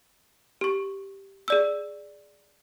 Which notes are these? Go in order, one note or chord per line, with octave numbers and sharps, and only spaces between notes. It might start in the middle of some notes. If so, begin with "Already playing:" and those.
G4 C#6
G#4 D5 E6